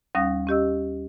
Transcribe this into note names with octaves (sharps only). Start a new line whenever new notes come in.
D#2 G3 C#4 F5 D#6 A#6
C#4 G4 D#5 E6